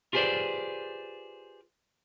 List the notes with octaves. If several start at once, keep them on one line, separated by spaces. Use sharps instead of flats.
F4 G4 G#4 B4 C5 D5